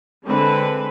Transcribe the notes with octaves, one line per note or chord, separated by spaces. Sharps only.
D3 G#3 C4 B4